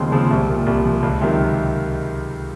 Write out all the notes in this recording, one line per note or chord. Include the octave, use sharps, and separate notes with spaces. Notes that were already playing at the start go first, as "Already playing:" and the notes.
Already playing: D#2 C#3 F3 G#3 C4
C#3 F3 G#3 C4
C2
A#2 F3
C2
A#2 F3
C#2
C3 D#3 F#3